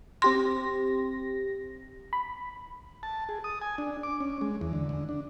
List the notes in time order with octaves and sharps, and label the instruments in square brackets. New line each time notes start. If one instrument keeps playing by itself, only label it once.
[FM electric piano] C4 G4 A#6 [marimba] C6
[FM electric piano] B5
[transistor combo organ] A5
G#4
D#6
G#5
D4
D6
C#4
G#3
E2
D3
D3
D4